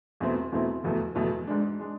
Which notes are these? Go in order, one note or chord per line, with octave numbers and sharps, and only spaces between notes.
E2 B2 A3 C4 E4
E2 B2 A3 C4 E4
F1 E2 B2 A3
F1 E2 B2 A3
G#2 G#3 D4
G#3 D4